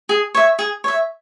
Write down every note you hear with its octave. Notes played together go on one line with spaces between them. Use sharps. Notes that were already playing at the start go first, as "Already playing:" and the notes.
G#4
C#5 E5
G#4
C#5 E5